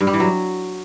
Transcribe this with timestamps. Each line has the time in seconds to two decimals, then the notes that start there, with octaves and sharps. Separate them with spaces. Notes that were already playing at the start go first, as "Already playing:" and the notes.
0.01 G2
0.07 G3
0.13 E3
0.20 F#3